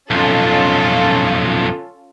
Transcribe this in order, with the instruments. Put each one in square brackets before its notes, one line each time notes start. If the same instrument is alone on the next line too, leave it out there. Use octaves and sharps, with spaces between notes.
[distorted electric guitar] B1 F2 [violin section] C#4 F4 A4